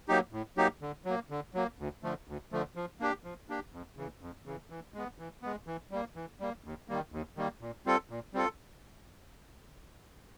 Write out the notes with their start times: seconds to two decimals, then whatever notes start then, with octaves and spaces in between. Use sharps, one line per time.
0.08 F#3 A#3 D#4 G4
0.32 A2
0.57 F#3 A#3 D#4 G4
0.82 D3
1.05 F#3 A#3
1.30 D3
1.54 F#3 A#3
1.79 D2
2.03 D3 F3 A3
2.28 D2
2.52 D3 F3 A3
2.76 F3
3.00 A#3 D4 G4
3.24 F3
3.49 A#3 D4 G4
3.72 F2
3.97 C#3 E3
4.21 F2
4.46 C#3 E3
4.70 E3
4.94 G#3 B3
5.19 E3
5.42 G#3 B3
5.67 E3
5.91 G3 A#3
6.16 E3
6.40 G3 A#3
6.64 D#2
6.88 D#3 G3 A#3
7.12 D#2
7.37 D#3 G3 A#3
7.61 A#2
7.86 G3 C4 F4 A4
8.10 A#2
8.34 G3 C4 F4 A4